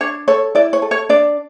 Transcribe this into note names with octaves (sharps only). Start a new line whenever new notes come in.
D4 C#5
A4 C#5
E4 D5
C#5
A4
C#5
D4 D5